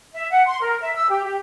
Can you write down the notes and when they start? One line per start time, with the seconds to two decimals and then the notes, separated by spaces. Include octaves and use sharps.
0.14 E5
0.31 F#5
0.46 C6
0.61 A#4
0.81 E5
0.95 E6
1.10 G4
1.24 G4